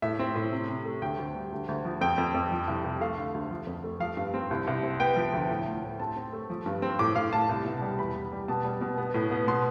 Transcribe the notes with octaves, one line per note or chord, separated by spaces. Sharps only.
A2 E5
C4
A2
C3
C3
A3
D2 G5
D2
G3
D2
D2
F3
F2 G5
F2
F2
F3
C2
C2
A3 F5
D3
D2
F3
F2
A3
F3 F5
G2
C4
C2
C2
C4
B3 G5
F3
D2
A2
A2
A2
C4 A5
C4
A3
F3
G2
C4
A2 D6
A2 F5
A2 A5
C2
B2
G3
E2 B5
E2
G3
B2 A5
G3
B2
B3
A2
B3
B2 C6